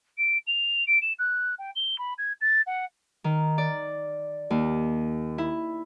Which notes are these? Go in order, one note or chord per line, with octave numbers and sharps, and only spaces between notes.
D7
F7
D7
E7
F#6
G5
G7
B5
G#6
A6
F#5
D#3
D5
D#2
E4